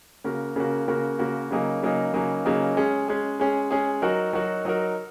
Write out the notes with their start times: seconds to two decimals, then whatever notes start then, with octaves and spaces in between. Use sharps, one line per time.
0.24 C#3 A#3 F#4 A#4
0.56 C#3 A#3 F#4 A#4
0.87 C#3 A#3 F#4 A#4
1.19 C#3 A#3 F#4 A#4
1.51 C#3 F#3 A#3 D#4 G#4
1.83 C#3 F#3 A#3 D#4 G#4
2.14 C#3 F#3 A#3 D#4 G#4
2.45 C#3 F#3 A#3 D#4 G#4
2.77 G#3 C#4 G#4
3.08 G#3 C#4 G#4
3.40 G#3 C#4 G#4
3.71 G#3 C#4 G#4
4.02 F#3 D#4 F#4 A#4
4.33 F#3 D#4 F#4 A#4
4.65 F#3 D#4 F#4 A#4